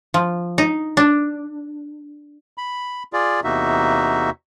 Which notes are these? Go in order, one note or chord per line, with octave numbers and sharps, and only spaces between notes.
F3
D#4
D4
B5
F4 G#4 D5
E2 C3 A#3 D#4 F#4 E5